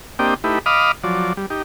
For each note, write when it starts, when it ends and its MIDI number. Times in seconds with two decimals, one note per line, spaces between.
0.19 0.34 58
0.19 0.34 60
0.19 0.34 62
0.19 0.34 67
0.19 0.34 75
0.19 0.34 79
0.44 0.59 57
0.44 0.59 63
0.44 0.59 64
0.44 0.59 67
0.44 0.59 71
0.66 0.92 75
0.66 0.92 77
0.66 0.92 83
0.66 0.92 86
0.66 0.92 87
0.66 0.92 89
1.04 1.33 53
1.04 1.33 54
1.04 1.33 74
1.37 1.46 55
1.50 1.62 63
1.50 1.62 67